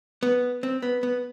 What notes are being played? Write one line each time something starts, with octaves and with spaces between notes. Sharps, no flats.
B3
C4
B3
B3